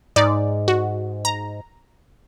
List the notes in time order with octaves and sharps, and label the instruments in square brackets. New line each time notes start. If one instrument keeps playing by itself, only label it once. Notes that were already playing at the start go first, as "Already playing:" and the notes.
[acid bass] G#2 [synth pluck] D#4 D5
[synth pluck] F#4
A#5